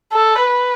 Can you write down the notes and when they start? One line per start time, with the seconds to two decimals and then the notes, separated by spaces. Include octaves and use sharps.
0.13 A4
0.46 B4